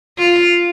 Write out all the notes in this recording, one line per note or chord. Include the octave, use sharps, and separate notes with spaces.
F4